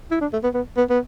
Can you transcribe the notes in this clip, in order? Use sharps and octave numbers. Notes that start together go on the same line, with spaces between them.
E4
D4
A3
B3
B3
B3
B3